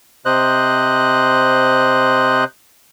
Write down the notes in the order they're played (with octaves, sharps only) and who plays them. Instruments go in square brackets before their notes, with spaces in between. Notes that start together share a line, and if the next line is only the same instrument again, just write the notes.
[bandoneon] C3 C5 D#5 F#6